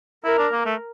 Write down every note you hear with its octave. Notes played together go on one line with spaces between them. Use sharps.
E4 A#4
D4
A#3
A3